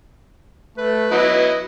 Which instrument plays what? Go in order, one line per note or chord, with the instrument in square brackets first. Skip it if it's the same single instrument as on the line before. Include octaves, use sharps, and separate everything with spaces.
[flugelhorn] A3 [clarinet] B4
[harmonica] F#3 B3 E4 [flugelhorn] D#5